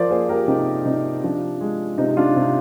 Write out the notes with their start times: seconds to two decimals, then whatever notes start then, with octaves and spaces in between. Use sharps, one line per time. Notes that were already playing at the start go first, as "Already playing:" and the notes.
Already playing: F3 A#4 C5 D5
0.10 A#3 G#4 C5
0.29 G4 A#4
0.48 C3 D#4 G4
0.85 C3 D#4
1.23 F3 D4
1.61 G#3
1.98 C3 D#4
2.17 D4 F4
2.36 C3